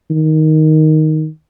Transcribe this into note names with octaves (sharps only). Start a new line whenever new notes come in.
D#3